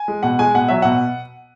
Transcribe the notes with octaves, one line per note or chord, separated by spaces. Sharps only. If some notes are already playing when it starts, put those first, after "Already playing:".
Already playing: G#5
G#3
B2 F#5
G#3 G#5
B2 F#5
F#3 E5
B2 F#5